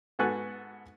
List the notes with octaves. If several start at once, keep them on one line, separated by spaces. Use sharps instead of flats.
G#2 B3 F#4 A4 G#5 F#6